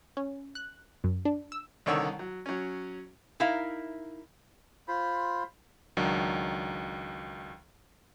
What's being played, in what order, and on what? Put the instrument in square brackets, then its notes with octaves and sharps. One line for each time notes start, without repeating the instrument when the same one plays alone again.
[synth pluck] C#4
F#6
F#2
D4
E6
[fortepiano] C2 D3 D#3 C#5 C#6 E6
F#3
F#3 C#4
[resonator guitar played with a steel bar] D#4 E4 A#4 E5 F5
[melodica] F4 C5 B5
[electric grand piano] C#2 D#3 F#3 D4